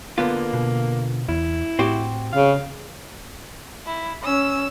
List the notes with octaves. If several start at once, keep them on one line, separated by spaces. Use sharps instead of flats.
D3 A#3 B3 F4
B2
E2 E4
A2 C4 F#4 G4
C#3 F5
E4
C#4 E6